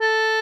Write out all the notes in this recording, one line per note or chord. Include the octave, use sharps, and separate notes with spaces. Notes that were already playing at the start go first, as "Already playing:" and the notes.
A4